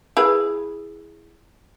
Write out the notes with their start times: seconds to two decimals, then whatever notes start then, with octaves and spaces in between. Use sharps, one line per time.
0.17 E4 G#4 B4